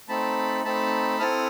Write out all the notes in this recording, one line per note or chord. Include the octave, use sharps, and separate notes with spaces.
A3 C4 D#4 A5 B5
A3 C4 D#4 A5 B5
C4 E4 A4 D#6 F6